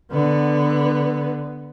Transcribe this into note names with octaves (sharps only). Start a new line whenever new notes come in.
D3 B3